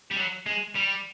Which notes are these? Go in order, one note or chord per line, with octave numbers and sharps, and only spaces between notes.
G3
F#3
G#3
G3